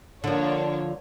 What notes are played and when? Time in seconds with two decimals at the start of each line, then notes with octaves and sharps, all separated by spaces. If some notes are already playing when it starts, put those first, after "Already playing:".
0.24 D3 F3 A#3 D4 C#5